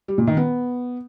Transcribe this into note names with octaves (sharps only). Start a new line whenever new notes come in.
G3
A#2
D#3
B3